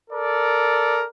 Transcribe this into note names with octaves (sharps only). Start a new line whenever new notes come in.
A4 A#4 D5